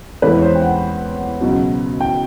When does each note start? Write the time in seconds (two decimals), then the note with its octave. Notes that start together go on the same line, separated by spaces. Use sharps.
0.22 E2 C3 E3 G#3 B4
0.38 C#5
0.42 C5
0.55 G5
0.62 F#5
1.41 C#2 B2 F#3
2.00 G5